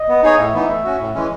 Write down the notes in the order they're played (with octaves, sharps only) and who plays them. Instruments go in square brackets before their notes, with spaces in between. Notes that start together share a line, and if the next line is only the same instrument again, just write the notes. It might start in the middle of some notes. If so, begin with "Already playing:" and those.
Already playing: [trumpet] D#5
[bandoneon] B3
D#4 G#4 C#5
[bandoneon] A2 [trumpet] E5
[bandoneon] E3 B3 D#4
A3
C#4 F#4
A2
E3 G#3 C#4